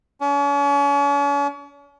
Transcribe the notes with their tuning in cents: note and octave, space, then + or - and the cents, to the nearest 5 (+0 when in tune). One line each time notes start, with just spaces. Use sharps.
C#4 +40